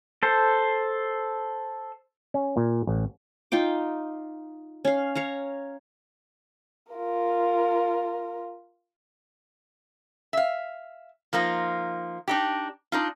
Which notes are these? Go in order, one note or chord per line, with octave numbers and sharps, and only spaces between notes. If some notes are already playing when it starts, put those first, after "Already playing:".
A4 C5
C#4
A#2
A1
D#4 F4 G5 D6
C#4 F5
C#5 F5 A#5
F4 A#4
E5 F5
F3 A#3 D#4 F4
D4 D#4 G4
D4 D#4 F4